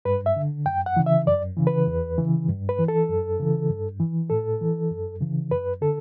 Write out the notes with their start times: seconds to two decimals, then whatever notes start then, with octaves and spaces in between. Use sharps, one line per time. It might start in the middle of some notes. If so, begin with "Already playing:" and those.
0.05 G2 B4
0.26 E5
0.36 D3
0.66 F#2 G5
0.86 F#5
0.96 C#3 E3
1.06 E5
1.27 F#2 D5
1.57 C#3 E3
1.67 B4
1.87 E2
2.18 C#3 E3
2.48 G2
2.69 B4
2.78 E3
2.88 A4
3.09 F#2
3.39 C#3 E3
3.69 G2
3.99 E3
4.30 A2 A4
4.61 E3
4.91 F#2
5.21 C#3 E3
5.51 F#2 B4
5.81 D3 A4